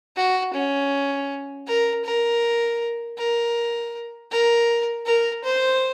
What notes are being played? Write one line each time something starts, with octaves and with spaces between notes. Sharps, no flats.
F#4
C#4
A#4
A#4
A#4
A#4
A#4
C5